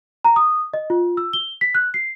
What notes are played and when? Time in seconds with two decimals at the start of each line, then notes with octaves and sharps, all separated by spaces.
0.24 A#5
0.36 D#6
0.74 D#5
0.90 F4
1.17 E6
1.33 G7
1.61 B6
1.75 F#6
1.94 C7